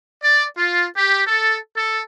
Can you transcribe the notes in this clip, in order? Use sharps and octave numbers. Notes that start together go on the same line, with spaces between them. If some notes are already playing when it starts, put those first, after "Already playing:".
D5
F4
G4
A4
A4